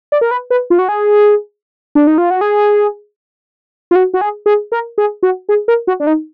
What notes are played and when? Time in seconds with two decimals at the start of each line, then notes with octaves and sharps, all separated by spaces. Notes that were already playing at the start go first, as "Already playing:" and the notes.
0.12 D5
0.21 A#4
0.31 B4
0.51 B4
0.70 F4
0.79 F#4
0.89 G#4
1.95 D4
2.07 D#4
2.18 F4
2.30 F#4
2.41 G#4
3.91 F4
3.95 F#4
4.14 F#4
4.21 G#4
4.46 G#4
4.72 A#4
4.98 G#4
5.23 F#4
5.49 G#4
5.68 A#4
5.87 F#4
6.00 D4
6.07 D#4